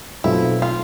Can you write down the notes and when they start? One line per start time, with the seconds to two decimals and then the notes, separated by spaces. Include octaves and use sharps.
0.24 B1 B2 A3 C4 E4 F4
0.62 F4